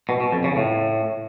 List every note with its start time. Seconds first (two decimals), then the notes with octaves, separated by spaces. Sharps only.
0.09 B2
0.21 B2
0.32 F2
0.44 C#3
0.56 A2